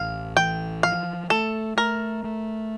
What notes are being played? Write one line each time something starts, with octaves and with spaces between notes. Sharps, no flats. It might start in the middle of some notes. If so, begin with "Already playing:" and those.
Already playing: A1 F5
E3 G5
F3 F5
A3 A4
A3 A#4
A3